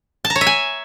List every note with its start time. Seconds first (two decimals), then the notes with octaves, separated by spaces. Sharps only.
0.25 A5
0.30 A#5
0.36 C#5
0.41 E5
0.47 G#5